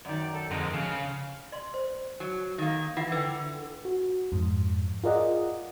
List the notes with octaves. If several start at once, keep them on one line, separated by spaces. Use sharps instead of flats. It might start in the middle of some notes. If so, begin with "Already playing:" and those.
F#2 D#3 D5
A4
F2 D3 G#3 A#4
C#3 F5
D5 C6
C5
F#3
D#3 A#3
E3 F4 F#5
D3 B4 G5
F#4
F2 G#2
F4 G#4 A#4 D5 D#5 F#5